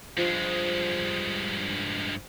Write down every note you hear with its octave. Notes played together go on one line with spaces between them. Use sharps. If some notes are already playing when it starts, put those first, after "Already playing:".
G2 F3 G#3